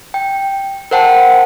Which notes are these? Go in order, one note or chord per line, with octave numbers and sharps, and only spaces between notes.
G5
A#4 C5 F#5 G5 A5